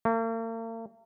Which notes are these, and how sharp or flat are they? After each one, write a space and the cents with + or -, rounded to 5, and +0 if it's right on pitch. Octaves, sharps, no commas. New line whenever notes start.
A#3 -45